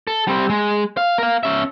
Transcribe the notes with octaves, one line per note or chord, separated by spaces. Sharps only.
A4
G3 C4
G#3
F5
A#4 F5
C#4 E5